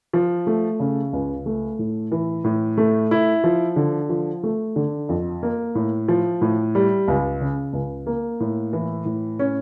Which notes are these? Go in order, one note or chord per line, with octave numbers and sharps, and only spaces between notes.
F3
A3
C#3
C#2
A3
A2
E3
A2
A3
E4
F3
D3
F3
A3
D3
F2
A#3
A2
F3
A2
G3
C#2
C#3
C#2
A#3
A2
E3
A2
C#4